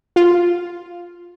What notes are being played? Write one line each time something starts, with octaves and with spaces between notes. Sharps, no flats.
F4